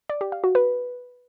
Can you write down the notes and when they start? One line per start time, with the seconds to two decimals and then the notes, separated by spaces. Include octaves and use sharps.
0.09 D5
0.21 G4
0.32 F5
0.44 F#4
0.55 B4